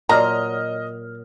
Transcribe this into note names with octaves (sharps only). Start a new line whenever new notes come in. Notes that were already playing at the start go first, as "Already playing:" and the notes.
A#2 F#3 D#5 A#5 F6